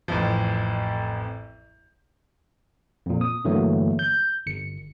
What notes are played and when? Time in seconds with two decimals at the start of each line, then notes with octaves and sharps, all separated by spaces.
0.08 A1 F2 F3
3.06 F2 A#2
3.21 D#6
3.45 G2 D3 E3 F#3 A3 A#3
3.99 G6
4.46 G1 C#7